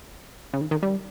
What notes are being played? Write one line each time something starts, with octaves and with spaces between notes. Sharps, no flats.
C#3
D#3
D#3
G3